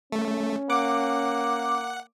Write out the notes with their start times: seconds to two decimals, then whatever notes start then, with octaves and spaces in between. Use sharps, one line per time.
0.12 A3 C#4
0.70 A#3 F#5 D6